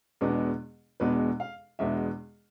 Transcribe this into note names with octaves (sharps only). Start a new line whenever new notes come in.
E2 B2 G#3 B3 D4
E2 B2 G#3 B3 D4 B4
F5
E2 B2 G#3 B3 D4 E5